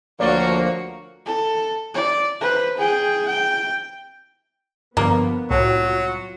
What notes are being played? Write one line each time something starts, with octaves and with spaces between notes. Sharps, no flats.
D2 F3 A#3 F#4 C#5 D5
A4
D5
B4 C5
G#4 G5
G5
G2 D3 F3 A#3 B3
C2 A2 F#3 F4 F#4